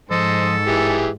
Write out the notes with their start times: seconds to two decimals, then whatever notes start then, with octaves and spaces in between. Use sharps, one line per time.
0.11 G#2 F3 A4 C5 D#5
0.67 D1 E3 G4 G#4